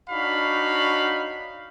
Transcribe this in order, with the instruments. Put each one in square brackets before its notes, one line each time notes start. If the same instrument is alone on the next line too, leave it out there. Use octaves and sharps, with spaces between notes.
[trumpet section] D4 D#4 F#4 C#5 F5 B5